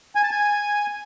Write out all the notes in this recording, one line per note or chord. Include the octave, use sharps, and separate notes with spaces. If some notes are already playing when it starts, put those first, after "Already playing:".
G#5
A5
G#5